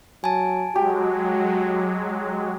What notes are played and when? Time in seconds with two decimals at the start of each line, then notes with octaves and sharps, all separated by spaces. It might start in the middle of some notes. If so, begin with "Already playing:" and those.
0.24 F#3 G#5 A5
0.75 F#3 G#3 F#4 G4